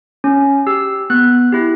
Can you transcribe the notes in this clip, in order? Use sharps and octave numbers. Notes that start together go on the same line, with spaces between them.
C#4
G4 E6
B3 F#6
E4 G4